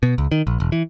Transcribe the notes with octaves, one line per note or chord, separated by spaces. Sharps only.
B2
C#2
D#3
A#1
E1
E3